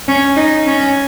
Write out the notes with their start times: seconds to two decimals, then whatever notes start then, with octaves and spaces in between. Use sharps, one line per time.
0.08 C#4
0.37 D#4
0.67 C#4